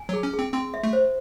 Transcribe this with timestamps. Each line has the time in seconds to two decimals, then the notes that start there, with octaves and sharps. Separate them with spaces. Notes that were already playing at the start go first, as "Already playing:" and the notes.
Already playing: G#5
0.09 F#3 G#4
0.23 C#4
0.33 G#4
0.39 C4
0.53 C4 C6
0.74 E5
0.83 A3
0.93 C5